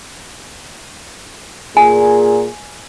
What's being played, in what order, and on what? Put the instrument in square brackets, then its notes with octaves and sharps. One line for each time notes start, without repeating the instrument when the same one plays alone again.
[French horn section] A#2 G#4 [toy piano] G#5